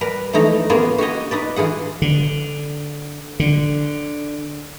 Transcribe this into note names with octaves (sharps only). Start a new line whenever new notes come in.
G3 A#4 B4
E3 F3 A3 D#4 A#5
A#3 B3 C#4 F4 G#4 A#4
F#4 G4 C#5 D#5
D#4 B4 D5
E3 F4 G#4 F#5
D3
D3